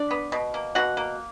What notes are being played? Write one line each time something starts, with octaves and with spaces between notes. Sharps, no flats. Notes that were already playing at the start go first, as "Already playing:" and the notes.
Already playing: D4 D5
B3
B2
A#3
B2 F#4 F#5
A#3